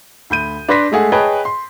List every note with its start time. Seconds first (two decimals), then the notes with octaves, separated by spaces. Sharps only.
0.30 D2 B5 G6 D#7
0.68 D4 B4 C6 A#6 B6
0.92 G#3 A3 G#4 F#5
1.12 G#4 B4 C#5 D#5 G5 A5
1.45 C6